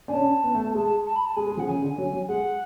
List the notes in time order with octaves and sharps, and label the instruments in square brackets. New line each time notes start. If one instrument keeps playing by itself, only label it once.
[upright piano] D4 [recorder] G#5
[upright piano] C#4 [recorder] A5
[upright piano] B3
A3
A3
[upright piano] G#3 [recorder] A5
[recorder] A5
A5
B5
A5
[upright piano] G#3 [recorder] G#5
[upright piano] G#3
[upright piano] F3 [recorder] F#5
[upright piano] C#3 [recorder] G#5
[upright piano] D3
F#3
F#3
[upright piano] G#3 [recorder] F#5